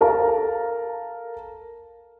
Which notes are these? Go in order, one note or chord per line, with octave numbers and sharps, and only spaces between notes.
A4 A#4 F5 A5 A#5